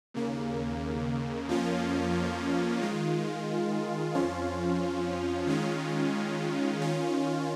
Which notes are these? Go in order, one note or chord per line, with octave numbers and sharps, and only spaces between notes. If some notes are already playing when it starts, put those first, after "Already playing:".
D#2 C#3 A#3
F2 F3 A#3 C#4 F4
D#3 G#3 F4
F2 F3 C#4 F4
D#3 G#3 C#4 F4
D#3 C#4 F4